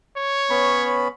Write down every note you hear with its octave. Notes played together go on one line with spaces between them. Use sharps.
C#5
B3 C#4 B5